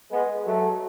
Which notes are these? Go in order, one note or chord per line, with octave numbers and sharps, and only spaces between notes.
G#3 B3
F#3 A3